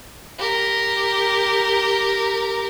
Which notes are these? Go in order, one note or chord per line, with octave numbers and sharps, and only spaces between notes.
G4 A#4